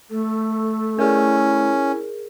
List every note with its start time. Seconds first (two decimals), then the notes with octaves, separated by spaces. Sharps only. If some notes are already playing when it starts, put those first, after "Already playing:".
0.10 A3 A4
0.99 C#4 E4 G#4 A#4